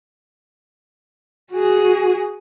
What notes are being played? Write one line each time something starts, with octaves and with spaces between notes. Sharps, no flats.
F#4 G#4